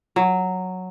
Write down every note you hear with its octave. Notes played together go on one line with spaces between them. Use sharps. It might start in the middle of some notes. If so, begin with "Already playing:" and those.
F#3